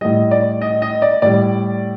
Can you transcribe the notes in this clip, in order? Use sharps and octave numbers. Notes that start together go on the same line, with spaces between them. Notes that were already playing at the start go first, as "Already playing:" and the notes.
A2 G3 D#5
D5
D#5
D#5
D5
A2 G3 D5